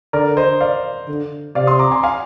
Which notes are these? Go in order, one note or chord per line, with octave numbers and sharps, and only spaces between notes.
D3 A#4 D5
C5 D#5
D5 F5
D3
C3 D5 F5
C6 D#6
A#5 D6
G#5 C6
F5 G#5